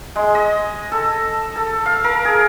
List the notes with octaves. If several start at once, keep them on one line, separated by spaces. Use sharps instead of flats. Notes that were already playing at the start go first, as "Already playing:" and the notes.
G#3
D#5
A4
A4
F5
A#4
G#4